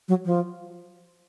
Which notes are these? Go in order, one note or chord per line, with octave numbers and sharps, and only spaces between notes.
F#3
F3